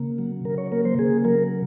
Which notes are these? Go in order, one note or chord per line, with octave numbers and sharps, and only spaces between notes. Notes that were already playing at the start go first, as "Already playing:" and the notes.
Already playing: C#3 A#3
F#3
C#3 A#4
C#5
A#3 A#4
C5
C#3 G#4
F#3 A#4